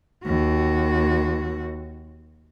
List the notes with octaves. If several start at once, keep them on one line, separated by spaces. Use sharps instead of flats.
D#2 F#4